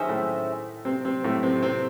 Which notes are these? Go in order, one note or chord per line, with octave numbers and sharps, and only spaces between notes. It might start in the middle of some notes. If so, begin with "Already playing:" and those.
Already playing: D#3 C#4 D#4 G#4 C5 E5
A2 A3
C3 C4
C3 C4
A2 A3
C3 C4
C3 C4